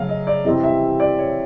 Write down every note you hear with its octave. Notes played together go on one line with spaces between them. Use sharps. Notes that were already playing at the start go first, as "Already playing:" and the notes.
Already playing: C#3 F#3 A3 F5
D#5
D5
C3 E3 G3 C4 D#5
E5
D5
C#5